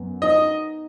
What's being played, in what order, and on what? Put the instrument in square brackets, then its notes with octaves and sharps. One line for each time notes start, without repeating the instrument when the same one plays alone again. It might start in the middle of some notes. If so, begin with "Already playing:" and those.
Already playing: [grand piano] F#2 B3
[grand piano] D#4 [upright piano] D#5